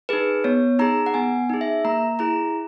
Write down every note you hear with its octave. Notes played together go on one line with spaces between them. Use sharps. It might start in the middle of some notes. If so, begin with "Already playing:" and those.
D#4 G#4 B4
B3 C#5
D#4 G#4 A#5
F#5
B3 G#5
D#4 G#4
E5
A#3 A#5
E4 G#4 A#5